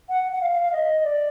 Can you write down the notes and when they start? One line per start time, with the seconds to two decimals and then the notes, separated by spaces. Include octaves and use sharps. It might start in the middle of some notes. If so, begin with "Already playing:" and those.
0.09 F#5
0.32 F#5
0.41 F5
0.52 F5
0.62 F5
0.73 D#5
1.04 D5